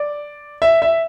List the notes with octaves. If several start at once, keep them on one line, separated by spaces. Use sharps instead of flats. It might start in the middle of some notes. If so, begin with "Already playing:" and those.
Already playing: D5
E5
E5